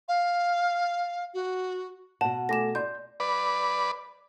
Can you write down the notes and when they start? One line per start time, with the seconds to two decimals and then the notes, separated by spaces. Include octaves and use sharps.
0.08 F5
1.34 F#4
2.21 B2 F#5 A5
2.49 A3 G#5 D6 A#6 E7
2.75 D5 C6 G6
3.20 B4 D5